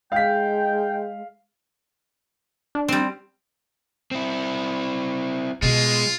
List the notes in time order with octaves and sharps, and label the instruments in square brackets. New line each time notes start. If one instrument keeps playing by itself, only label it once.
[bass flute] G#3 [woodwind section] D#4 G5 [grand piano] F5 B6
[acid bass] D4
[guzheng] G3 C4
[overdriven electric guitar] C4 E4
[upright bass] B2 [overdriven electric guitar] G#3 [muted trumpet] F4